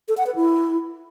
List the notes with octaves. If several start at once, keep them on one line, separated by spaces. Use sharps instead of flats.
A4
F#5
B4
E4